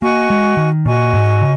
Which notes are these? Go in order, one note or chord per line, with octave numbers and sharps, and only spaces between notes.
A#3 F#4 D#5 G#5 C#6
G#3
D#3
A#2 F#4 D#5 G#5 C#6
G#2
C#3